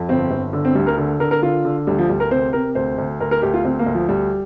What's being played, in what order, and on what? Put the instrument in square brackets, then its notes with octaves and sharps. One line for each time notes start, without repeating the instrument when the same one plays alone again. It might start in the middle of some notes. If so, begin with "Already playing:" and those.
Already playing: [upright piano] F2
G1 C4
G1
D3
C4
D2 G3
A#4
D3
D3 A#4
A#4
D3 F4
D3
D2 G3
F3
D2 G3
A#4
C3 C5
C3 A#4
D2 C5
D2
D2 A#4
A#4
D2 G4
F4
D2 C4
A#3
D2
F3
D2 G3